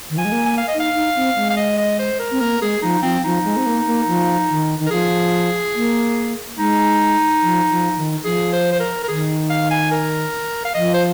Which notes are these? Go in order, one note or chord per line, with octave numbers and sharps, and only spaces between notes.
D#3
F3 G#5
G#3
A#3
G#5
F5
D#5
D#4
F5
D#4
C4
G#3
F5
D#5
D#5
C5
A#4
C4
A#3 A#4
G#3 G#4
F3 D#4
F3 C4
F3 D#4
G#3
C4
A#3
A#3
F3
D#3
D#3
A#4
F3 G#4
A#3
G#3 D#4
F3
F3
D#3
F3 G#4
C5
C5
A#4
A#4
D#3 G#4
F5
G#5
A#4
F5
F3 D#5
C5